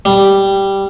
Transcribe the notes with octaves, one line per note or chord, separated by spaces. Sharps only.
G3